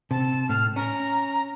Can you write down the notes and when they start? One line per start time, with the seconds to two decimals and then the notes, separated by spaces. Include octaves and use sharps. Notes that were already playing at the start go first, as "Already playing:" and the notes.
0.11 C3 A5
0.49 A2 F6
0.76 C#4 A#5